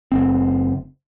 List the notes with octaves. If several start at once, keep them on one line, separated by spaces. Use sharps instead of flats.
F#1 C4